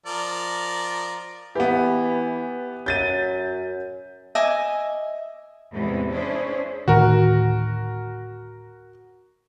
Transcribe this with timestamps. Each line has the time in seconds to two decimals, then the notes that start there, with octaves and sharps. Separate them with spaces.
0.06 F3 A#4 D5
1.55 E3 B3 G4
2.86 F#2 G6 A6 D#7
4.35 D#5 E5 G#5 D6
5.72 E2 A2 C3 E3 G#3
6.12 C#4 D4 E4 G#4 B4 C5
6.88 D2 A2 D#3 F#4 A#4